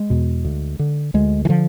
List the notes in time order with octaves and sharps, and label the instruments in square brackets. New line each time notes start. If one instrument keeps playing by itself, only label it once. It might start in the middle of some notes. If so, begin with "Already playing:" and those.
Already playing: [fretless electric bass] G#3
E2 B2
D2
D3
D2 G#3
E3
D3 F3